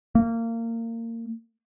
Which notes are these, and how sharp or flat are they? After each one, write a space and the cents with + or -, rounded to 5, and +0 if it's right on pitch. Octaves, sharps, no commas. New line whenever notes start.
A#3 -25